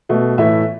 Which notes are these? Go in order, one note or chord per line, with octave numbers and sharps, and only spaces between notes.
B2 A3
A2 E3 A3 E5